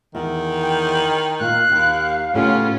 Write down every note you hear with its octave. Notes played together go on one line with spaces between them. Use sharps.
E2 D#3
G5
A#2 F5 F#6
D#2 G4
A2 C#3 B3 C#4 F4 G4